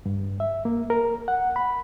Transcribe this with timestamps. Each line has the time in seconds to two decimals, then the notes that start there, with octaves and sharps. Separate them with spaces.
0.06 G2
0.40 E5
0.65 A#3
0.90 A#4
1.28 F#5
1.56 B5